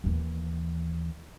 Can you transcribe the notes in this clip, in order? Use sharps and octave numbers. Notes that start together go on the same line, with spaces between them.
D#2 E3